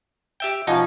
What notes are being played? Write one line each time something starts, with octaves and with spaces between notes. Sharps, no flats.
G4 E5 G5
B2 F3 C#4 D#4